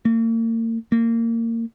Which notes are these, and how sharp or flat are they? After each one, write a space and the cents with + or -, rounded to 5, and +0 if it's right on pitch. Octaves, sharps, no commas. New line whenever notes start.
A#3 -40
A#3 -25